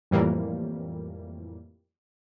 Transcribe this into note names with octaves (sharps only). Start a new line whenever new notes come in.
F2 A2 E3 G3 A#3